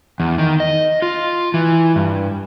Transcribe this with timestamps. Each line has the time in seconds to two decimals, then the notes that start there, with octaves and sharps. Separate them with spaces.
0.20 E2
0.38 D#3
0.60 D#5
1.02 F4
1.54 E3
1.96 G2